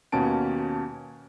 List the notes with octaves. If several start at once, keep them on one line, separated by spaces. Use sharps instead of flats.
D#2 B2 A#3 C#4 A5 D7